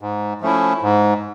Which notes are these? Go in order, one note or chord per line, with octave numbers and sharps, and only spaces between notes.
G#2
F3 A3 C#4 E4
G#2